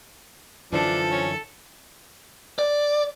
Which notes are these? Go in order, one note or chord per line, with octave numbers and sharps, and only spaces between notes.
F#2 D3 E3 F3 D4 A4
C#4
D5